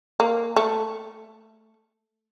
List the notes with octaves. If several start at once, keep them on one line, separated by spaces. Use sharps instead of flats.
A#3
A3